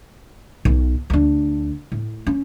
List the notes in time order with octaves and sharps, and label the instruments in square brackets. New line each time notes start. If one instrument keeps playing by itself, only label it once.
[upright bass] B1
D2 D4
A2
C#4